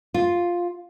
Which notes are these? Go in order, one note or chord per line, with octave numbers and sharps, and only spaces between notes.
F4